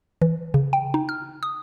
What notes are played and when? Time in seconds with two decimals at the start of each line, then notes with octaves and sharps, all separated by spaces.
0.22 E3
0.54 C#3
0.73 G5
0.94 D#4
1.09 F6
1.43 D#6